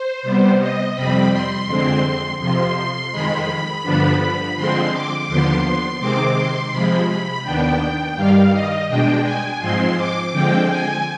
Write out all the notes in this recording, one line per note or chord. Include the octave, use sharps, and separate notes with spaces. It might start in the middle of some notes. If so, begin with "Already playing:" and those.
Already playing: C5
C3 G3 B3
D#5
F2 C3 G3 C4 B5
C6
F2 D3 G#3 C4
F2 C3 F3 C6
C6
F2 D#3 G#3 B5
G2 D3 F3 B3 D4
B5
D3 F3 G#3 C4 C6
D6
D#2 D3 F3 B3 C6
C6
C3 D#3 G#3 C4 D6
C6
C3 F3 G#3 B5
B5
D#2 D#3 B3 D4 G5
G5
G2 D#3 G3 F5
D#5
B2 G#3 D4 G5
G#5
G#2 F3 G#3 C4 C6
D6
D3 F3 G#3 C4 G5
G#5